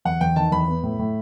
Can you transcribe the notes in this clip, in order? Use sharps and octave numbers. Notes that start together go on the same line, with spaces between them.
E2 F#5
E2 G5
D#3 A5
E2 B5
B3
A2
A2